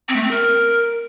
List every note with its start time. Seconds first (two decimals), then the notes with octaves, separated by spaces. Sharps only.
0.09 C4
0.16 A3
0.24 C4
0.31 A#4